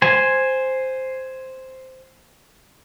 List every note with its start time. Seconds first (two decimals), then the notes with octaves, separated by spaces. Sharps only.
0.02 C5 G#5